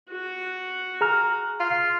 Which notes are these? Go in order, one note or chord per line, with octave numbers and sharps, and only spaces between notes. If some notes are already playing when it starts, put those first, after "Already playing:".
F#4
G#4 A#5 F6
F4